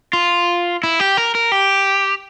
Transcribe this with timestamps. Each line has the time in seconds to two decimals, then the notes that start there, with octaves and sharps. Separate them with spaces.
0.13 F4
0.83 E4
1.00 G4
1.17 A#4
1.35 A#4
1.52 G4